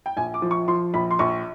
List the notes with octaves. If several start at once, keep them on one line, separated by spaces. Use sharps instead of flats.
G5
A#1 G#5
D6
F3
C#6
F3 C6
A#1 B5
C6
A#1 C#6